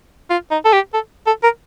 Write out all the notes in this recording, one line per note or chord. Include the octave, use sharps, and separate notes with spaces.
F4
D#4
A4
G4
A4
A4
A#4